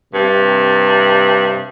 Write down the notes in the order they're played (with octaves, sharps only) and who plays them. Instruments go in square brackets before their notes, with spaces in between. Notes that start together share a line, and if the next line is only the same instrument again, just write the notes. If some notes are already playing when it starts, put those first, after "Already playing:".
[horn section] G2 C3